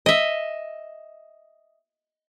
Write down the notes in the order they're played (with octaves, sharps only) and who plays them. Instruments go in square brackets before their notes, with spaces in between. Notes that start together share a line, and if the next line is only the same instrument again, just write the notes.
[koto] D#5 E5